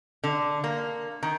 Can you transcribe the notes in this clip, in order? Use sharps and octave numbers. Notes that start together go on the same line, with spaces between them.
D3
A#3
D#3